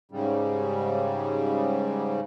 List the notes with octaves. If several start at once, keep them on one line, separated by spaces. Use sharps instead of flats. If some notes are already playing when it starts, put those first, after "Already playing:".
G#2 C#3 G3